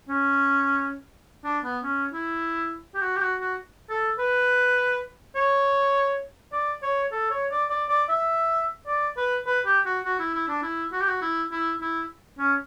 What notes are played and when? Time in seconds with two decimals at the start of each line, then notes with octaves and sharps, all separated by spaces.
0.09 C#4
1.44 D4
1.64 B3
1.84 C#4
2.13 E4
2.95 G4
3.01 F#4
3.16 G4
3.21 F#4
3.40 F#4
3.90 A4
4.19 B4
5.36 C#5
6.53 D5
6.83 C#5
7.12 A4
7.31 C#5
7.51 D5
7.71 D5
7.89 D5
8.09 E5
8.87 D5
9.17 B4
9.46 B4
9.66 G4
9.86 F#4
10.05 F#4
10.19 E4
10.34 E4
10.48 D4
10.63 E4
10.92 F#4
11.00 G4
11.07 F#4
11.22 E4
11.51 E4
11.81 E4
12.39 C#4